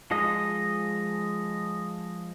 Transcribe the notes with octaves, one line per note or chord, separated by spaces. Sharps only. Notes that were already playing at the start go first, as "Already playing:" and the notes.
F3 G#3 D#5